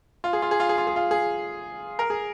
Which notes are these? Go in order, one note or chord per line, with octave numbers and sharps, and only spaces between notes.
F4
G#4
F4
G#4
F4
G#4
F4
G#4
F4
G#4
A#4
G#4